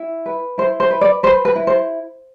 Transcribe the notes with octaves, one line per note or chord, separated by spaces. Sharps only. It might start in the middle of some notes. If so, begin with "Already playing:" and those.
Already playing: E4
B4
E4 C5
C5
B4
D5
B4 C5
B4
E4
C5